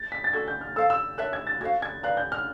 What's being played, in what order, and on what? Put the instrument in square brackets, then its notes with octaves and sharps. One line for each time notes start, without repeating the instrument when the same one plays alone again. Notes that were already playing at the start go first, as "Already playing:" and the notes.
Already playing: [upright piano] A6
B6
A6
[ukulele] D4 F#4 A4 [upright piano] G#6
[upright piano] G6
F6
[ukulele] A4 C5 F5 A5 [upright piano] E6
[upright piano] E6
[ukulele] A#4 C#5 E5 A5 [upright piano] F#6
[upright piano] G#6
A6
[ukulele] F#4 A4 C5 F5 [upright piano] G#6
[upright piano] G#6
[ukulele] B4 D5 F5 A#5 [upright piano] F#6
[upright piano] G6
F6